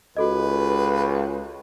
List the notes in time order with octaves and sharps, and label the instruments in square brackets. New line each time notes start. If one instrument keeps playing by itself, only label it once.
[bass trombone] C#2 [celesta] F#4 A4 D#5 [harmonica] B4